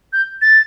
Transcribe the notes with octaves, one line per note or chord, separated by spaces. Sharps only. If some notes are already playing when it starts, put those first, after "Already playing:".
G6
A6